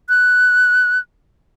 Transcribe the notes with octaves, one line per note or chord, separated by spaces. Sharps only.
F#6